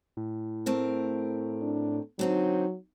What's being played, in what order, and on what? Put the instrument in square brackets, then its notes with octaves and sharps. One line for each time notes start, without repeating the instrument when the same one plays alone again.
[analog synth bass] A2
[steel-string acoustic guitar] A3 C4 A#4
[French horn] D4
[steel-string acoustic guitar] D3 C4 D#4 [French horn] F#3